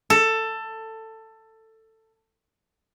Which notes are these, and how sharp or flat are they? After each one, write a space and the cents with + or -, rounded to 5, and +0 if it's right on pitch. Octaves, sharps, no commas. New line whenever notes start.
A4 +15